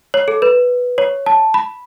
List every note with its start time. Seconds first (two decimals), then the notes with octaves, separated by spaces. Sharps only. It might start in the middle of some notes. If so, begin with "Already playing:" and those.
0.14 C#5
0.28 A4
0.42 B4
0.98 C#5
1.26 A5
1.54 B5